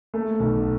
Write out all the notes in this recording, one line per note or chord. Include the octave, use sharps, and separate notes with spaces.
A3
B1